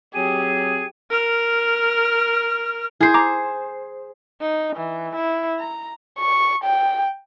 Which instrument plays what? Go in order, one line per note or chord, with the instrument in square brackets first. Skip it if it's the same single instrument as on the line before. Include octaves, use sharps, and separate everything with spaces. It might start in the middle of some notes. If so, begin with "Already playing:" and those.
[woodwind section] F#3 C4 G#4 [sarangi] G4 [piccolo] D#7
[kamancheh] A#4 F6
[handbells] E4 C7 [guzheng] G#4 C5
[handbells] A#5 D6
[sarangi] D#4
E3
E4
A#5
[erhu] C#6
G5